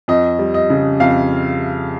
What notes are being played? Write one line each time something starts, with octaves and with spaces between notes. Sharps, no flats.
F2 D#5
G3
D#5
C#3
F2 F5